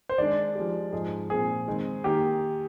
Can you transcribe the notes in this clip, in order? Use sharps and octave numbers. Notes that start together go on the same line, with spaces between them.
C5
D#3 G#3 D4 D5
F3 G#3 D#4 G4
G#2 F3 G#3 D#4 G#4
A#2 F3 C4 G#4
D#3 G#3 C4
D#3 A#3 G4